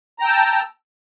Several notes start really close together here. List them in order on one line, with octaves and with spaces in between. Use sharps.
A#5 G5 E6 A5